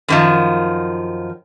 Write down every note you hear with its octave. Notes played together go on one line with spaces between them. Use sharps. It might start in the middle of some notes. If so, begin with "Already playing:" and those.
F#2 D#3 F3